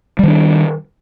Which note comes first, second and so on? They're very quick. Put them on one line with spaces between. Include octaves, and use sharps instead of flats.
G3 D#3 D4